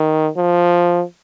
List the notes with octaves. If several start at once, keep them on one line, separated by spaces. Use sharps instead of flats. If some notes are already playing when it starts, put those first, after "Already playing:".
Already playing: D#3
F3